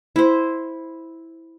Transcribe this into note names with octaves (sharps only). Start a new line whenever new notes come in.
E4 C5